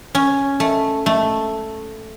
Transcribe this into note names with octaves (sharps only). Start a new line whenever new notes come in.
C#4
A3
A3